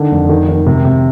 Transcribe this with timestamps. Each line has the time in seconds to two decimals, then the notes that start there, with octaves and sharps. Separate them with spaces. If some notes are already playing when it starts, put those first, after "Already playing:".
Already playing: D3 D#3
0.11 F1
0.29 D#3
0.48 D#3
0.66 C3
0.85 C3